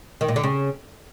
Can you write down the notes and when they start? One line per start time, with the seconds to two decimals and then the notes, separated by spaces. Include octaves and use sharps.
0.21 D#3
0.28 A#2
0.36 D3
0.44 C#3